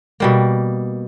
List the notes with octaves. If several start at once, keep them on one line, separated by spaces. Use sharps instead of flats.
B2 G3 A#3